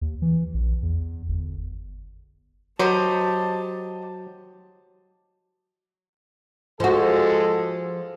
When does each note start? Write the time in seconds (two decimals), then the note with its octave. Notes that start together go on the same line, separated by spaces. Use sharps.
0.01 D#2
0.22 E3
0.54 A#1
0.83 E2
1.29 G1
2.79 F#3 G4 C5 D#5 A5
6.80 F3 G#3 F#4 G#4 A4